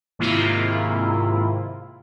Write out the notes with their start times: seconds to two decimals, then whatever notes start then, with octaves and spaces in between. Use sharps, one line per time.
0.19 G#2 C3 D#3 A#3 E4 F4